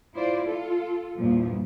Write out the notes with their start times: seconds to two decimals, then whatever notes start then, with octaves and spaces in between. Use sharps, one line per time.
0.14 E4 F4 C5 D5
0.47 F4 A4
1.16 E2 G2 A#2 F3